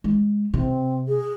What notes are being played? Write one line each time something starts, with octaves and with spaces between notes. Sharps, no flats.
G#3
C3 C4
G#4